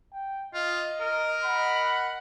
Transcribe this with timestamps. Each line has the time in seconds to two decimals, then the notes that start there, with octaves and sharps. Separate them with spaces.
0.13 G5
0.54 F4 D#5
1.00 A#4
1.44 F#5 B5